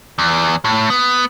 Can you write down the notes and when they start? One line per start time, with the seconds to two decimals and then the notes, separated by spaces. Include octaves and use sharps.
0.19 E2
0.64 A2
0.90 B3